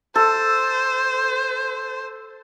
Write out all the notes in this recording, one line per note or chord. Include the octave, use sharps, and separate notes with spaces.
A4 C5